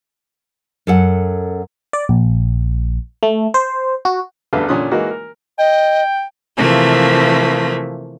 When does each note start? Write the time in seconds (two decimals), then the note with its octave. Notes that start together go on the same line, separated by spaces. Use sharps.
0.87 F#2 A4 F#5
1.93 D5
2.09 A#1
3.23 A3
3.54 C5
4.05 F#4
4.53 A1 E2 D3 A4 B4 F5
4.68 A#2 D3 C#4 C6 D#6 F#6
4.91 E3 G#3 A#3 D#4 F#4 A#4
5.10 A#4
5.58 D#5 G5
6.57 C3 E3 F3 A3 A#3